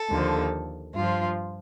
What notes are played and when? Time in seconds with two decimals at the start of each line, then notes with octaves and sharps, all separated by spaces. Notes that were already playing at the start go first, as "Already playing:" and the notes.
Already playing: A4
0.09 D#2 D3 F3
0.94 G2 F3 F4